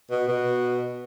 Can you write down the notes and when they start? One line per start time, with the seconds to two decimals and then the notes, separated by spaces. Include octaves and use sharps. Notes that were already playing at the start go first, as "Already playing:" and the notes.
0.10 B2
0.28 B2